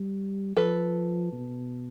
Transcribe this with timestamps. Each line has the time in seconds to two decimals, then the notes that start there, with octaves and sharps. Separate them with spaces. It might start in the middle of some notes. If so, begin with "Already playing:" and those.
Already playing: G3
0.57 F3 A4 B4
1.32 B2